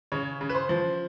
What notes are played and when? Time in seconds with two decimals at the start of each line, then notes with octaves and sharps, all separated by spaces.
0.12 C#3 C#5
0.41 C#3
0.49 B4
0.55 C5
0.69 F3